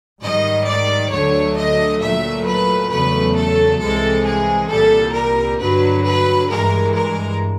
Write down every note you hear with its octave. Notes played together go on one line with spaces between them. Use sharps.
G#2 D#3 G3 D#5
D5
D2 D3 F#3 A3 C#5
D#5
A#2 F#3 A3 E5
B4
E2 C#3 F#3 A3 B4
A4
C2 C3 E3 G#3 A4
G#4
C2 A#2 G3 A4
A#4
G2 D3 F#3 B4
B4
G2 E3 G#3 A#4
A#4